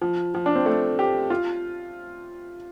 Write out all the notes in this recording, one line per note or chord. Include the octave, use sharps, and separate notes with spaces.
F3
F3
D4
C4
A3
G4
F4